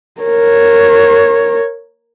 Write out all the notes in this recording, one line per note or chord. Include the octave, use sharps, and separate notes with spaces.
A#4 C#5